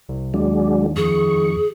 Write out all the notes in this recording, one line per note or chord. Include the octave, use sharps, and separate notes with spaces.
C2
D#2 F#3 G#3 D4
F2 G#4 C#6